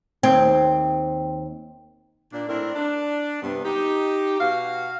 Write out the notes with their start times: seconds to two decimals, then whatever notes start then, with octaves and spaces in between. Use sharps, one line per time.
0.23 D#2 C4
2.32 A#2 D4
2.47 A2 C4 D4 E4 A#4
2.74 D4
3.42 G2 C3 B3
3.64 D#4 G4
4.40 B2 F#4 F5